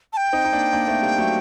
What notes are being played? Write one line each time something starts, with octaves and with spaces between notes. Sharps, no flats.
A5
G5
C4 D#4
D#4
A#3 D4
A#3 D4
A3 C4
G3 A#3
F#3 A3